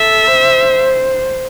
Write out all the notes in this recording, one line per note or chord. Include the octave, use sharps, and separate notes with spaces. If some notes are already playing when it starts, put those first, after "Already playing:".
Already playing: A4 E5
C5